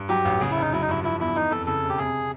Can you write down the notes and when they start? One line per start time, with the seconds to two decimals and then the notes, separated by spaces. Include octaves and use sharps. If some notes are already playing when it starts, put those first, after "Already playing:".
Already playing: G2
0.09 F#3 G4
0.25 A1
0.40 C#3 G#4
0.51 E4
0.57 F1 D#4
0.73 F#3 E4
0.82 D#4
0.89 G2 E4
1.04 F3 E4
1.19 E2 E4
1.35 E3 D#4
1.51 F2 A4
1.67 C#3 A4
1.83 E1
1.89 G4
1.98 C3 G#4